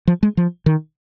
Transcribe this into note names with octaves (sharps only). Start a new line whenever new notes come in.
F3
G#3
F3
D#3